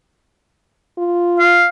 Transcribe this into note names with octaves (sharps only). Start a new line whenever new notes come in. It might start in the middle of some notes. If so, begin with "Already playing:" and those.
F4
F5